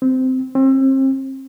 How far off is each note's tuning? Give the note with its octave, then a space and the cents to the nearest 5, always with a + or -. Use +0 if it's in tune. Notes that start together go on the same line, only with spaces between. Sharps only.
C4 -15
C4 +35